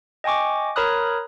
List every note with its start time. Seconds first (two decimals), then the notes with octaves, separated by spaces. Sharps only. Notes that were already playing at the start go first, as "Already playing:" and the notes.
0.24 D#5 G5 G#5 C#6 D6
0.76 A#4 C#5 A#5 B5 D#6 F#6